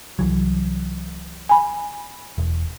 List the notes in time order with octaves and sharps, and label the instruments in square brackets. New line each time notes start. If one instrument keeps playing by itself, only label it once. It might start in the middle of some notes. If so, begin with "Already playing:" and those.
[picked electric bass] C2 E3 F#3
[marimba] G#5 B5
[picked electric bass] E1